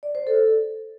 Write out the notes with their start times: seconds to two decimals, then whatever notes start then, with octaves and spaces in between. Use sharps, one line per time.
0.03 D5
0.15 C5
0.27 A4